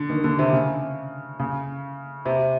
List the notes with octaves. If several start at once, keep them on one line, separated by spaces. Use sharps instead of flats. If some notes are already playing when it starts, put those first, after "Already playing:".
Already playing: D3
D#3
D3
C3
C#3
C#3
C3